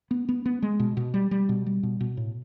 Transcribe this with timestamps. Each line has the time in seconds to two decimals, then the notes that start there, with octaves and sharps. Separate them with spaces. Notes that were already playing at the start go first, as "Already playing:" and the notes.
0.11 B3
0.29 B3
0.46 B3
0.62 G#3
0.80 B2
0.97 B2
1.14 G3
1.31 G3
1.49 B2
1.66 G3
1.83 B2
2.01 B2
2.17 A2